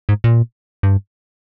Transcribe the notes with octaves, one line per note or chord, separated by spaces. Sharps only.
G#2
A#2
G2